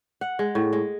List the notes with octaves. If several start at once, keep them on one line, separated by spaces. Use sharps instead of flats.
F#5
G#3
A2
G#3